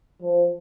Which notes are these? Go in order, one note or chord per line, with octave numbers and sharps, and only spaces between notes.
F3